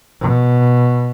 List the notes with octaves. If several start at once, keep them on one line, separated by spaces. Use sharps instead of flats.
B2